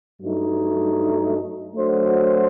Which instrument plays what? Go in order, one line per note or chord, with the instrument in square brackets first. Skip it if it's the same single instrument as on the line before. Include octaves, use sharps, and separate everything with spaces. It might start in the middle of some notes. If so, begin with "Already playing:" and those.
[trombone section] G2 F#3 A3 D#4
F#3 A3 D4 F#4 C5